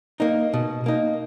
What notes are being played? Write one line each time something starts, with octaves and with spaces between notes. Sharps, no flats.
A#3 D#4
B2
A#3 D#4